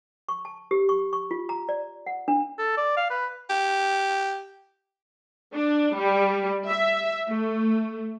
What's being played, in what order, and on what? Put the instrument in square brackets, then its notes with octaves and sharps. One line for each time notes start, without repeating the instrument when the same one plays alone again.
[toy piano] C#6
A5
G4
C#6
C#6
F4
A#5
D5
F#5
D4
[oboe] A4
D5
F5
B4
[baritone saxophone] G4
[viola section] D4
G3
E5
A3